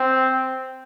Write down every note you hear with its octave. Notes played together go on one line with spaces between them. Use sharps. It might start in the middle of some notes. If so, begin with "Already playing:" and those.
Already playing: C4